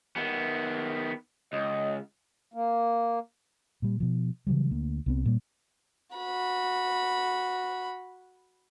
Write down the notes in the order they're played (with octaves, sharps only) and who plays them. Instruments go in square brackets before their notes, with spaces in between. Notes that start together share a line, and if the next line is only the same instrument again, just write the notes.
[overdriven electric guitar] D#3 B3
[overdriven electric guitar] C#2 [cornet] D#5
[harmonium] A#3
[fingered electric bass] A#2 G3
B2 F3
C#3 E3 F#3 G3
D2 A#3
C2 B3 C4
A#2 G3 A#3
[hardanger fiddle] F#4 B5